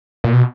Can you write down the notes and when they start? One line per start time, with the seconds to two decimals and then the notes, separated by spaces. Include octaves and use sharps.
0.24 A#2
0.33 B2